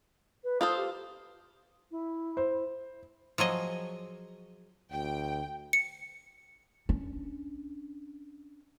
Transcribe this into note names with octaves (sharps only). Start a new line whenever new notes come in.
B4
F4 A4 C5 D#6
G4
E4
C5
F3 F#3 G#4 D#5
D2 G5
C#7
C#4 D4